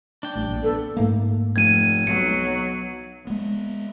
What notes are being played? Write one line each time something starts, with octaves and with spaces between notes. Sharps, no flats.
D4 G5
A1 A2 G3
A#1 A#2
B3 A4
G#2 A3 A#3
F1 G#6 D#7
B1 F#3 C#7
G#3 B3